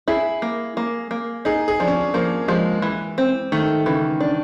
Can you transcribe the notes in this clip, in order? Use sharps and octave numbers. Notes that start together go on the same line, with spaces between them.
E4 G#4
A#3
A#3
A#3
D#4 G#4
G#4
F3 D4
C#4
D4
F3 A#3
F3 G#3
E3
C4
D#3 A3
C#3 E3
D4